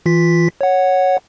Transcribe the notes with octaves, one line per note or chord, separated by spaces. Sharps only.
E3 F4 B6
C#5 F#5